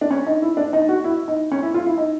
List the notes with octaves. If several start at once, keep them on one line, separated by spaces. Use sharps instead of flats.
D4
C#4
D#4
E4
D4
D#4
F#4
E4
D#4
C#4
E4
F4
E4
D#4